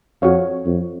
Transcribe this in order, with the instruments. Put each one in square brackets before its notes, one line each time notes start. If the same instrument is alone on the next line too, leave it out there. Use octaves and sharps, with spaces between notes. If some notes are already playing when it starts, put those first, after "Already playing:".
[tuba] F2 [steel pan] F#4 C#5 F5
[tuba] F2